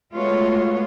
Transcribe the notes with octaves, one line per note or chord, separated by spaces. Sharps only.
G#3 A3 B3 F4 F#4 C#5